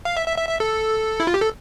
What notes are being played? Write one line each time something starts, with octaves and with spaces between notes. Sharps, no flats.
F5
E5
E5
E5
E5
A4
E4
F4
G4
A4